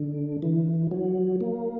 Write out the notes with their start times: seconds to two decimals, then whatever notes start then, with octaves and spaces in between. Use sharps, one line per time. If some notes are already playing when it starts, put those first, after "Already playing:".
Already playing: D3
0.42 E3
0.91 F#3
1.41 A#3